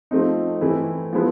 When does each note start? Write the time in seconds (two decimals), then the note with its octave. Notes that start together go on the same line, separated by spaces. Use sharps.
0.11 F3 A3 C4 D#4
0.61 E3 A3 C4 E4
1.13 F3 G#3 B3 E4